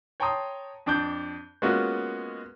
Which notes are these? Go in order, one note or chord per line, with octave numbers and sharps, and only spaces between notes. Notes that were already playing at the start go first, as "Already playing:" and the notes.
C#5 G5 A5 A#5 C6 D#6
F2 D4 D6 G6
G#3 A#3 B3 C#4 F4 F#4